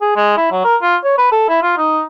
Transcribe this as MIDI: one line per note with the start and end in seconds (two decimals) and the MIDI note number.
0.01 0.12 68
0.16 0.37 56
0.37 0.50 64
0.52 0.61 54
0.64 0.76 70
0.82 0.96 65
1.04 1.15 73
1.18 1.29 71
1.32 1.48 69
1.49 1.59 64
1.62 1.73 65
1.78 2.02 63